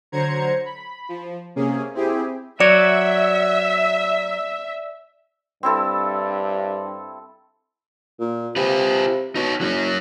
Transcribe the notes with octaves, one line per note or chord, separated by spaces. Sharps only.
D3 F#3 C5 A#5 G#6 C#7
B5
F3
C3 A#3 C#4 G#4
C4 E4 G4 G#4
F#3 F#4 C#5 D5 E5
G2 C4 E4 A4
A#2
C3 F4 B4
B2 D#4 C#5
F#1 F#3 C#4